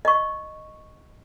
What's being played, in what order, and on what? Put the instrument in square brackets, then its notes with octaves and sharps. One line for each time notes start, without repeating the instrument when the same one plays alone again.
[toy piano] D#5 C#6